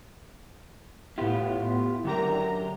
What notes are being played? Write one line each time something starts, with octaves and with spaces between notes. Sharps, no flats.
A2 B3 E4 F4 G4
F#2 D3 G4 A#4 A#5